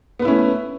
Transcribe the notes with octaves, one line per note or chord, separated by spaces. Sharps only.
A3 B3 C#4 E4 B4